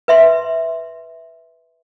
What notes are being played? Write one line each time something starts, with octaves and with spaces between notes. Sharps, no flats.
B4 E5 C6